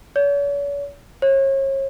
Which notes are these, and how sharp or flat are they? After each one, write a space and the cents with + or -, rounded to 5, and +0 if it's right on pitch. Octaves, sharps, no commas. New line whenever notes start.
C#5 +45
C#5 -35